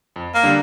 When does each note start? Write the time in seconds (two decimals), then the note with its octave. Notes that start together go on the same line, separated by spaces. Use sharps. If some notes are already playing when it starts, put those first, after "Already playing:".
0.16 F2
0.35 A#3
0.43 D3 G3 D4 A4